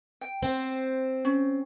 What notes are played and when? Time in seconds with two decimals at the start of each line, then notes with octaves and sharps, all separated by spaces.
0.21 G5
0.43 C4 C5
1.25 C#4